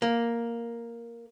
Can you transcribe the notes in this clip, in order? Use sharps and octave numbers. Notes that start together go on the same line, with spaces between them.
A#3